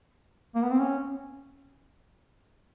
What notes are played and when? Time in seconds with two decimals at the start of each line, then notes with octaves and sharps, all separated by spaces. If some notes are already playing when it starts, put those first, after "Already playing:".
0.55 A#3
0.63 B3
0.71 C4
0.80 C#4